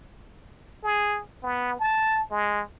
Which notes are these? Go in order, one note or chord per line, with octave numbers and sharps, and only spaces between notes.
G#4
B3
A5
G#3